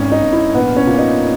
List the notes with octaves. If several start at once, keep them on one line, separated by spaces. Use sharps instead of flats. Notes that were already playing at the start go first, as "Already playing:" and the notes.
Already playing: G#1 C#4
D#4
G#1
E4
A#1 B3
C#4
A#2
D#4